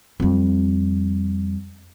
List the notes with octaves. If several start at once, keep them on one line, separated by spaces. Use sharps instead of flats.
F2 G3